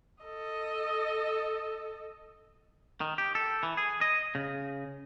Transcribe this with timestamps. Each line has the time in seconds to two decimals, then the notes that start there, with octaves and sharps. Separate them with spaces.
0.24 A4 D#5
3.01 D#3
3.18 G4
3.35 A4
3.63 E3
3.77 G#4
4.01 D#5
4.35 C#3